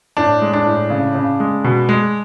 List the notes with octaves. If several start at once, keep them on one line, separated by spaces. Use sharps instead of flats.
A2 D4
G#3
D4
A2
C#3
C#3
G#3
B2
G#3